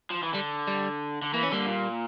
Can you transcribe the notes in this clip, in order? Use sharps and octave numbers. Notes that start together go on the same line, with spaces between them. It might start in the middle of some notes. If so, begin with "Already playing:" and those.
F3
E3
D3 G3
G3
D3
E3 A#3
C#4
D3 G3 A#3
A#2